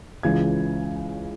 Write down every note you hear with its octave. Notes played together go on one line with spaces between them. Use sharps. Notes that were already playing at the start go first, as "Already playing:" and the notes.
C#2 C#3 E3 G#6